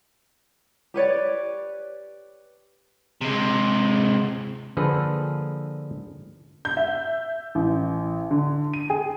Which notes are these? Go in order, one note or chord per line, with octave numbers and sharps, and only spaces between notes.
G4 B4 C#5 D5
C3 G#3
D3 F3 A#3 G#4 A4 B4
G6
E5
A1
D3
D#7
G#4